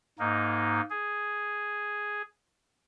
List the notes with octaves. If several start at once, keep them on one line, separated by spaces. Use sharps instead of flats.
G#2 A#3 D#4
G#4